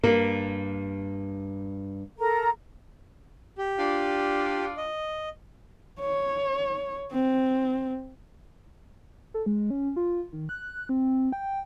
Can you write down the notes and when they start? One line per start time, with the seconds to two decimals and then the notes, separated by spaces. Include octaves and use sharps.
0.04 G2 A#3
2.18 A4 A#4 A#5
3.58 G4
3.79 D4 F4
4.77 D#5
6.00 C#5
7.12 C4
9.34 A4
9.46 G#3
9.70 C#4
9.96 F4
10.33 D#3
10.49 F#6
10.89 C4
11.32 G5